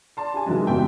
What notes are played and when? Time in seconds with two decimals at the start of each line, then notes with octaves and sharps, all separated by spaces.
0.17 D5 A5 C6
0.34 G4 G#5
0.46 C3 D#3 E3 F#3 G#3
0.67 F#1 C2 B2 G#3 E5 G5